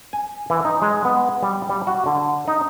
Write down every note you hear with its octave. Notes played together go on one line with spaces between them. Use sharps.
G#5
E3
D#4
G#3
B3
G3
G3
F#4
D3
D#4